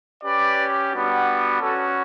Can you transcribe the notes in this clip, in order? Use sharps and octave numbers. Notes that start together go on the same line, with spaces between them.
C#4 G4 B4 D5
G3 B3 D4 F#4
C#4 F#4 A4